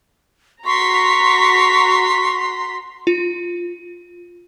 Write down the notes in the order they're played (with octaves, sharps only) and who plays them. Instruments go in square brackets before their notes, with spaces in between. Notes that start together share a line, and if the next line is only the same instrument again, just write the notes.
[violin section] F#4 A#5 B6 [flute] C6 [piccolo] C#6
[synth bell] F4